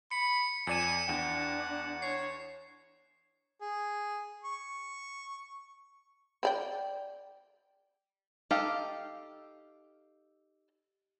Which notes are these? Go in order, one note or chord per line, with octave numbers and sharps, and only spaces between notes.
B5 C#7
F2 D5 G#5 C#7 D#7 E7
E2 D4 F#5 G5
C#5 C7
G#4
C#6
C4 D5 G5
D#4 G4 A4 F5